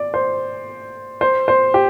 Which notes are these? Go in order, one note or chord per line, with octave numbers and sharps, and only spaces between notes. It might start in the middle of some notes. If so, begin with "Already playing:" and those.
Already playing: D5
C5
C5
C5
G4